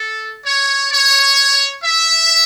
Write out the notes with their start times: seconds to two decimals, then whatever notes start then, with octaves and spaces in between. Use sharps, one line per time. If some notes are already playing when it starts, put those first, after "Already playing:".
Already playing: A4
0.45 C#5
0.91 C#5
1.83 E5